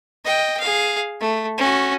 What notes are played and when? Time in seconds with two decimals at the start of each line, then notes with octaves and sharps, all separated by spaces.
0.24 D#5 G5
0.60 G#4 F5
1.21 A3
1.58 C#4 F#4